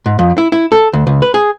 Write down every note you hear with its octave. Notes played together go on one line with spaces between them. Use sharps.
G#2
F2
E4
E4
A4
D2
C#2
B4
G#4